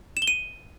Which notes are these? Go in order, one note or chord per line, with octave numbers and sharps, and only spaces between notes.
E7
G7
D#7